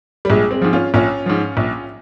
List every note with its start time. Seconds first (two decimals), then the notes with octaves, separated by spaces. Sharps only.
0.25 G3
0.30 A#1 G#3
0.51 G#3 C4
0.62 G#2 F3
0.73 C#4 F4
0.94 A#1 C#4 F4
1.26 G#2 F3
1.57 A#1